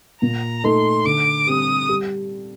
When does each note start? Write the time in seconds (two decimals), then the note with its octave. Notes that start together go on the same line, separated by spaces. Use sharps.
0.22 A#2 A#5
0.64 A3 D#4 A4 C6
1.05 D3 D6
1.47 G3 C4 G4 D#6
1.89 G3